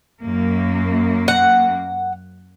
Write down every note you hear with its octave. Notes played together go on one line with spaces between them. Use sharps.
F#2 A#3
F#5